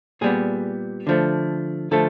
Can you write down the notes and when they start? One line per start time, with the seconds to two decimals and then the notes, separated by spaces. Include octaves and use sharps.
0.21 A#2 G3 B3 G#4
1.07 D3 F3 A3
1.91 D3 F3 A3 A4